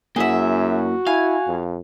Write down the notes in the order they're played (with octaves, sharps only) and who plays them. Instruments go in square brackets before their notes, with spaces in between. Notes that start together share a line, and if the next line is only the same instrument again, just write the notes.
[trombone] F#2 [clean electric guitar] A#3 E4 F#5 [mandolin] G#4 E5
[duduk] F#4
[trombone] E4 [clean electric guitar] F5 [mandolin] G#5
[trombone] F2